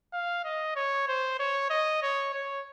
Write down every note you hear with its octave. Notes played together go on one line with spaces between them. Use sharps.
F5
D#5
C#5
C5
C#5
D#5
C#5
C#5